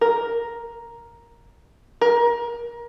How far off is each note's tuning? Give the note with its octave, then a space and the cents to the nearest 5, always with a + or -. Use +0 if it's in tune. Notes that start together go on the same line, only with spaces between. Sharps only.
A#4 +5
A#4 +25